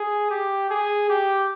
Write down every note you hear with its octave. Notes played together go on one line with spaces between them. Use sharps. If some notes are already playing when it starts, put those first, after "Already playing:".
Already playing: G#4
G4
G#4
G4